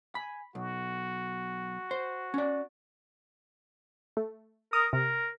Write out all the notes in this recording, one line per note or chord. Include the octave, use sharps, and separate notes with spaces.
G#5 B5
B1 F#4
C5
C#4 D5
A3
A#4 D#6
C3 A#4